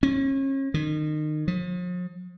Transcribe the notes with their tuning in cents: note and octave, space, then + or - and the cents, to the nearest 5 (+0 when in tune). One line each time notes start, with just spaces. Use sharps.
C#4 -35
D#3 -30
F3 +45